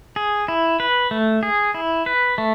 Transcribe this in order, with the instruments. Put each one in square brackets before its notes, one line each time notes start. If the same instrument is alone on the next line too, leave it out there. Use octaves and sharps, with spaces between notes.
[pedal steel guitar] G#4
E4
B4
A3
G#4
E4
B4
A3